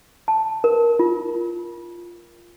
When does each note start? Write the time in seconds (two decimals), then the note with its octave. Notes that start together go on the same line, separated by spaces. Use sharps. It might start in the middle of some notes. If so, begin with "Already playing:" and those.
0.28 A5
0.64 A#4
0.99 F4